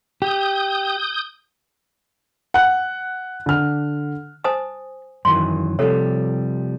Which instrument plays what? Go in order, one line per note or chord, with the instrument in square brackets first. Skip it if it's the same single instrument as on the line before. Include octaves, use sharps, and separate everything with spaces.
[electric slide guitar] G4 [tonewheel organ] D#6 G6
[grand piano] F#5 F#6
D3 F6
[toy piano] C5 G#5 D#6 [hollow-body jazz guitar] A5
[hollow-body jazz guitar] F#2 D#3 E3 [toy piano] C6
[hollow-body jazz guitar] C3 F3 G3 [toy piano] A4 C#5